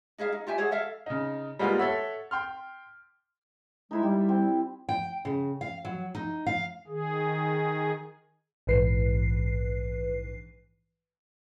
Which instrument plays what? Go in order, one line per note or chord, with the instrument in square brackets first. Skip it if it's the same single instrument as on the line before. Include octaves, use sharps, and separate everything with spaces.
[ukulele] D#4 G#4 E5 F5
D#4
F4 G4 E5 G#5
G#4 A4 C#5 F#5
A4 E5 F5
[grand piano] C#3 D#4
G3 G#3 A#3 B3 F4
A4 C#5 E5 F#5
G5 C6 F6
[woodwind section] G#3 [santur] D#4 E4 E5
[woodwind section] G3 [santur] G4
[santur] C4
[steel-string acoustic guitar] G5
C#3
F5
F#3
D#4
F5
[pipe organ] D#3 G#4
[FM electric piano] A#1 G#2 E3 B4 C7